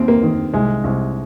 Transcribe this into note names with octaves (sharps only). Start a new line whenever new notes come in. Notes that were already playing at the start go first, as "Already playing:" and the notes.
Already playing: D#2 D#3 C4
A#3
D#3
C2 G#3
C2